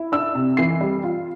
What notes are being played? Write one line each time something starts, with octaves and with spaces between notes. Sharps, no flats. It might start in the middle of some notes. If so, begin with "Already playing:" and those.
Already playing: E4
D4 E6
C3
E3 C7
G3
F4